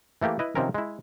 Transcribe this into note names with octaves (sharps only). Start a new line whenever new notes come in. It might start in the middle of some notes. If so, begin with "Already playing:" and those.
E3 A3 A#3 G4
E4 B4 D#5
C3 D#3 F3 C4 C#4 A#4
G#3 E4